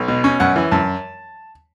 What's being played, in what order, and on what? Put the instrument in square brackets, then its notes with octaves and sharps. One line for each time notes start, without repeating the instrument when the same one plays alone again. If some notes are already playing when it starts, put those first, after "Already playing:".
Already playing: [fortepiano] B1
B2
C#4
F#2 F#5
E3
F#2 A5